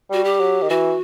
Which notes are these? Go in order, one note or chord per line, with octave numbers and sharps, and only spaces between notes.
G3 F#4
G4
F#3
D#3
E3 F#4